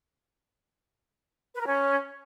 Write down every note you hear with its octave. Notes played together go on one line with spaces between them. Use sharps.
B4
A#4
C#4